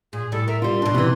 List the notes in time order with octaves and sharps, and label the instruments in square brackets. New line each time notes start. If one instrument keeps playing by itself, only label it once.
[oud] A#2 [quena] G#4
[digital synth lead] A2 [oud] G3 [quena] A4
[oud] A#4 [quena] E5
[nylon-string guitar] G3 F4 [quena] C6
[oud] E2 B2 [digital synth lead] D4
[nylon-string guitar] C3 E3